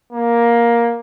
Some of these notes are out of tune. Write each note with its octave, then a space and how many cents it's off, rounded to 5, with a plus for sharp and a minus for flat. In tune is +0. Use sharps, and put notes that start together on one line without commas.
A#3 +10